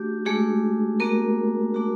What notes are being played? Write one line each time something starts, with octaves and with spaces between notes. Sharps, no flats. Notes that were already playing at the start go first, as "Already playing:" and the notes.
Already playing: A3 D4 F#4 G4
G#3 A3 D4 F#4 G#4
A3 A#3 D4 F#4 A#4
A3 D4 F#4